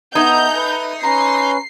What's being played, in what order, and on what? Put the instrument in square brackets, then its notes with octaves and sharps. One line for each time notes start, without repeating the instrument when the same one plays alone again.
[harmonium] B3 D#5 [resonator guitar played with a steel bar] D#4 [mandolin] A4 E5 G#5 [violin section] A#5 G6
[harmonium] B4
[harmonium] C#4 B4 [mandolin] A#5 C6 [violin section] C7